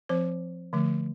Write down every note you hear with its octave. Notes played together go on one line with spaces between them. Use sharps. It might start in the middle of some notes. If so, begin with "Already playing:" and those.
F3 C4 C5
D3 F3 A3